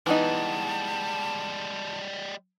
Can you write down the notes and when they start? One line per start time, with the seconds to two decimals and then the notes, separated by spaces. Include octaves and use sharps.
0.06 E3 G3 G#3 B3 D#4 A5